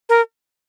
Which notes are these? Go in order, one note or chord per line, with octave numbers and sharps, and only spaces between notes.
A#4